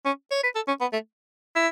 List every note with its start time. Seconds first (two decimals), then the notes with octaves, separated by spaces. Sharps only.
0.05 C#4
0.31 C#5
0.43 B4
0.55 A4
0.67 C#4
0.81 B3
0.93 A3
1.56 E4